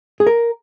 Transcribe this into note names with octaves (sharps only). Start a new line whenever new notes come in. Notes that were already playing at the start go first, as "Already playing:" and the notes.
G#4
A#4